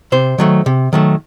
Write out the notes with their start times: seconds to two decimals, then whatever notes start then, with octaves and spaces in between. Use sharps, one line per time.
0.12 C3 C5
0.38 D#3 F#3 A3
0.66 C3
0.93 D#3 F#3 A3